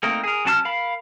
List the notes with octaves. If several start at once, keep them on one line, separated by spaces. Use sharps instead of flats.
A3 A#3 C4 D#4 A#4
G#4 A#4
F#3 C#4 A5 C6 F6
A#4 F5 B5